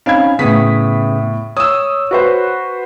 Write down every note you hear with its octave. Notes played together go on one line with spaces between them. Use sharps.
C4 C#4 D#4 F5 B5 G#6
A2 C#3 B3 D#6 B6
C#5 D#6 E6
F#4 B4 C5